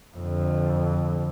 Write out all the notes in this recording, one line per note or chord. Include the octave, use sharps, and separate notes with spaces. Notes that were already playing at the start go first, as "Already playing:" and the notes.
F2 D3